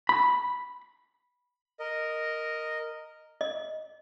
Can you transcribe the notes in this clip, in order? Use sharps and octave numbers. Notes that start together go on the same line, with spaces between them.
B5
A#4 D#5
D#5